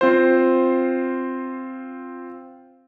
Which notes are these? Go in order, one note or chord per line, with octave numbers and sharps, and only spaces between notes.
C4 F4 C5